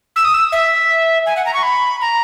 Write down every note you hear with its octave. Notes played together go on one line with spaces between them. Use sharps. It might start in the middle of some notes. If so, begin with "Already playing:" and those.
E6
D#6
E6
E5
G#5
F#5
A#5
C#6
B5
A#5